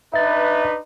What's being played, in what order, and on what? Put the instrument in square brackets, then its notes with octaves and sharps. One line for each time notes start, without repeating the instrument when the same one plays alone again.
[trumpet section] D4 D#4 B4 [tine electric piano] E5 A6